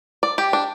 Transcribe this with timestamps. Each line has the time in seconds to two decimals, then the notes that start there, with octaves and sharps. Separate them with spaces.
0.23 D5
0.38 G4
0.53 D4